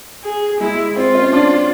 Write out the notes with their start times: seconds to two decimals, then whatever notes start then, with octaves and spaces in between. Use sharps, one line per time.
0.24 G#4
0.60 G#3 E4
0.96 C4 F4
1.15 C#4
1.33 D4